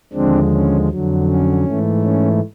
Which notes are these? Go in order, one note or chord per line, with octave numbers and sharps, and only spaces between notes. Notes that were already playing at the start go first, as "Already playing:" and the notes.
D#2 D3 F3 G#3 C4 D4
C#4
F2 D3 F#3
C#4
G#2 E3 A3
C#4